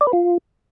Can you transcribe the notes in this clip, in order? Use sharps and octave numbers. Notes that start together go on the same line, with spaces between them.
D5
B4
F4